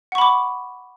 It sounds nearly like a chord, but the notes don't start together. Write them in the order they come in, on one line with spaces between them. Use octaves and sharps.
F#5 C#6 B5 D6